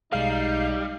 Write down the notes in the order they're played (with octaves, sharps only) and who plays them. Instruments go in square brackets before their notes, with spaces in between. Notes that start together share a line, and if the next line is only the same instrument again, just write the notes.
[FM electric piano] B1 G#3 [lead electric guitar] G3 [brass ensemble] D#4 [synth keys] F5 C7